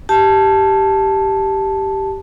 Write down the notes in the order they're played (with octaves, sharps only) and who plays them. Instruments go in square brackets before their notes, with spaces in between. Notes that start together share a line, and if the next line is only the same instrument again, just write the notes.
[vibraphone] G4 A5